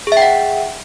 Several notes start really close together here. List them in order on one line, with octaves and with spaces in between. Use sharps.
G#4 E5 G5 F#5